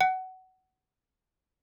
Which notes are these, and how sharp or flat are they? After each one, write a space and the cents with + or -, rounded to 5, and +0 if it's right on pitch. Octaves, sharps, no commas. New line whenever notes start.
F#5 +20